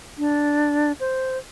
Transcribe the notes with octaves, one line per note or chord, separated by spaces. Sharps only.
D4
C5